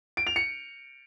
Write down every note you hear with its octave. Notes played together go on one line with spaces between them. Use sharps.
D7
F7
C#7